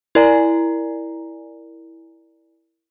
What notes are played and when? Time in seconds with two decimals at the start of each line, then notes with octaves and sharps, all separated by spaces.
0.15 E4 A#4 D5 G#5 A#5